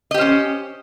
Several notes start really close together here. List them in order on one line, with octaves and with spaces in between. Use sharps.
D#5 G4 C5 C#4